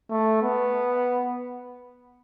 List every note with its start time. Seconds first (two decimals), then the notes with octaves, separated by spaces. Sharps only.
0.10 A3
0.42 B3